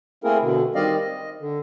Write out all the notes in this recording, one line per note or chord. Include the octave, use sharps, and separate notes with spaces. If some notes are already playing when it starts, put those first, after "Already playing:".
A3 A#3 C4 E4 G#4 A#4
B2 D3
D#3 G3 C4 D5 D#5 F5
D#5
D3